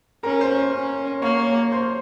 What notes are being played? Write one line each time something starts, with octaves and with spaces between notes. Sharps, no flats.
C#4 A#4 A#5
C5 C6
C#4
A#3 C#5 C#6
C#5 C#6
C5 C6